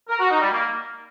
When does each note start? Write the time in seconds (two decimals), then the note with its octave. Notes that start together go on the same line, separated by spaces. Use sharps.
0.09 A#4
0.19 F#4
0.30 D#4
0.40 G3
0.51 A#3